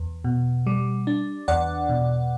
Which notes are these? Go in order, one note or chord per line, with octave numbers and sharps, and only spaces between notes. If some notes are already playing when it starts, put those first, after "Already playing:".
Already playing: E2
B2
G3
D4
E2 D5 F#5
B2